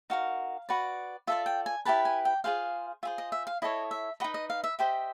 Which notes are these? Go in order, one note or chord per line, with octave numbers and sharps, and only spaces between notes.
D#4 F#4 A#4 F5
F#4 B4 D5
F4 A4 D5 E5
G5
G#5
E4 G4 B4 A5
G#5
G5
F4 G#4 C5 F5
F4 G#4 C5 E5
D#5
E5
F5
E4 A4 C#5 D#5
E5
D#4 F#4 B4 D#5
D#5
F5
E5
G4 C5 D#5 E5